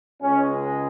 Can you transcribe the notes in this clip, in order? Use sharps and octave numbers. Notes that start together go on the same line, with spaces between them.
C#2 C#3 G#3 C#4